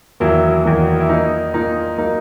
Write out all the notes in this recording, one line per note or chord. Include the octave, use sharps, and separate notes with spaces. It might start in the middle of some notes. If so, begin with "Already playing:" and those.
E2 D#3 F#3 A#3 E4
E2 D#3 F#3 A#3
E4
A#2 A#3 D#4
A#2 A#3 D#4
F#3 A#3 D#4